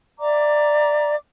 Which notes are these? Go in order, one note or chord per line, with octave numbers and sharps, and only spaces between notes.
D5 E5 A#5 D6